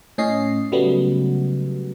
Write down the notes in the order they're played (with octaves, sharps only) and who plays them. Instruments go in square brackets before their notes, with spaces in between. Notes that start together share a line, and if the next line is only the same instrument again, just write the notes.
[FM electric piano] A2 C#4 D#5 C7
C#3 F#3 G3 A3 B3